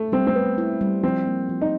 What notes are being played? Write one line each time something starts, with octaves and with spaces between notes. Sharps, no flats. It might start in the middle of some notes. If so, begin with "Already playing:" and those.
Already playing: A3
G3 C4
C4
G3 B3
E4
G3
F3 C4
A#3
F3
D#4